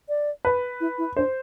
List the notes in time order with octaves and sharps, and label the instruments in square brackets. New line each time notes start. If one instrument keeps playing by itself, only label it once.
[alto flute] D5
[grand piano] B4
[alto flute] E4
E4
[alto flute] D4 [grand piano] C5